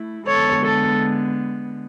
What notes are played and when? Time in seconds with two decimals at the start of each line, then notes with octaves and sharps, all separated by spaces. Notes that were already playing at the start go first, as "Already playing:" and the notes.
Already playing: A3 E4
0.27 D3 G#3 B3 A4 C#5
0.64 A4